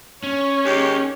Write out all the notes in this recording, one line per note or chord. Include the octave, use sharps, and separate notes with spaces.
C#4 C#5
D#2 G#3 G4